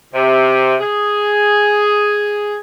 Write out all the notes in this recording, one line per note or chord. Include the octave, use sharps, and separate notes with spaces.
C3
G#4